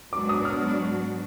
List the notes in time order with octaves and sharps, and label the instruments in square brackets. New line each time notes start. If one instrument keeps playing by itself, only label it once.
[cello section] G#2 F#3 B3 D4 F#4 [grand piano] D6
[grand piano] D#6
F6